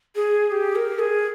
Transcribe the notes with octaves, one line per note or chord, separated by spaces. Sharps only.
G#4
G4
A#4
G#4